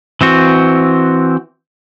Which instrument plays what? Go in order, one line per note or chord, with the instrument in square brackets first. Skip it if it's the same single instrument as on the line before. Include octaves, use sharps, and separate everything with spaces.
[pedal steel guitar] E3 C4 F#4